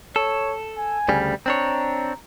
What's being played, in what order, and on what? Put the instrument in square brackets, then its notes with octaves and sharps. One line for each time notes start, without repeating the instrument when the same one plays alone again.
[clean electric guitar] A4 [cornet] C#5
[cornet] G#5
[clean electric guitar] D2 C#3 G3
[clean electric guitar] C4 D4 C#5 [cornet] A#5